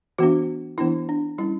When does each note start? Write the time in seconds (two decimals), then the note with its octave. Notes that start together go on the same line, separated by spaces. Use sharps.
0.19 E3 B3 D4 F#4
0.78 E3 B3 D4 E4
1.09 D4
1.38 G3 C#4 E4